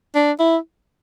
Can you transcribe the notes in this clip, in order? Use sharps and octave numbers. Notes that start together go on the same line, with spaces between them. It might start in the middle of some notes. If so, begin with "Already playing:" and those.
D4
E4